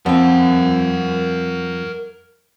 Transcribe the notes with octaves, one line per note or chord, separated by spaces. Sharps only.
F2 C4 A#4 F#5